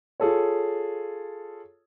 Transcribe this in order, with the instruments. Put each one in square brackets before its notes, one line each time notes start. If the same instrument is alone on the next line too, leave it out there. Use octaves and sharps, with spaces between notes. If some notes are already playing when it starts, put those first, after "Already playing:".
[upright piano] F4 G#4 A4 C#5